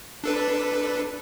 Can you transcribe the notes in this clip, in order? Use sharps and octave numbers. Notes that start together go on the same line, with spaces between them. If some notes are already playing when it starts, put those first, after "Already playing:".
D4 A4 B4